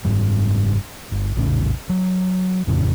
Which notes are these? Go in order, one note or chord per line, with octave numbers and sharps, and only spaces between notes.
F#1 G#2 G3
G1
A#1 E2 A2 C#3
F#3
G#1 F2 A2 C#3